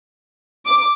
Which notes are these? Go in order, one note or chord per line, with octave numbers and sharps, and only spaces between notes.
D6